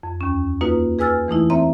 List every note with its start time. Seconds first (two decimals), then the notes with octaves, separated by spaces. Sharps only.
0.03 F2
0.21 D#2 C#4
0.61 A#3 D#4 F4 F#4 B4
0.99 G#4 B4 G#5 E6 F6 A6
1.28 E3 A3 D#4 E4
1.50 C4 C#5 E5 A#5 C6